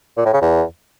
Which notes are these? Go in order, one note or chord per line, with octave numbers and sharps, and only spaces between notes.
A#2
A2
C#3
E2